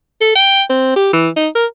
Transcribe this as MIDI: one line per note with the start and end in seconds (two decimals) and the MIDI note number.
0.21 0.34 69
0.36 0.62 79
0.70 0.96 60
0.96 1.11 67
1.13 1.29 52
1.37 1.48 63
1.55 1.66 70